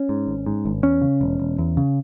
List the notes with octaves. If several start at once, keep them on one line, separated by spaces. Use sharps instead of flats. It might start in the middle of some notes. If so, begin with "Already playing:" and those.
Already playing: C#4
G#2
G#1
G#2
G#1
E2 C#4
C#3
E1
E1
E2
C#3